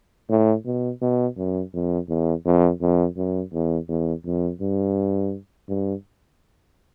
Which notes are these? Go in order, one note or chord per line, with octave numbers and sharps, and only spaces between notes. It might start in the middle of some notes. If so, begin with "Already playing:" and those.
A2
B2
B2
F#2
F2
E2
F2
F2
F#2
E2
E2
F2
G2
G2